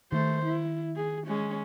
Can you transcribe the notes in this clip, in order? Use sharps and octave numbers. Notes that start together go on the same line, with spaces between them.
D#3 A3 C5
E4
G#4
G#3 C#4